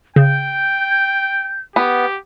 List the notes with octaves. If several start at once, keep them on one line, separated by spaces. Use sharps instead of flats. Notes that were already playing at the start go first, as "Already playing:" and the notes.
C#3 G5 G6
B3 G4